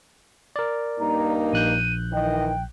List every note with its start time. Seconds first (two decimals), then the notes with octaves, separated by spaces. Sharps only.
0.56 A#4 D5
0.99 G2 A#3 D#4 A#5
1.53 A#1 F#6 G6 D#7
2.12 D#3 E3 D#5 G5